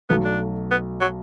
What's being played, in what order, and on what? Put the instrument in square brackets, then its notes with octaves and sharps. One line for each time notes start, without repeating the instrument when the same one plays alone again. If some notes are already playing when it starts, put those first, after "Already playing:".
[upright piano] B1 B2 F#3 A3 [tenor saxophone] B3
[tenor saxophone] D4
B3
F#3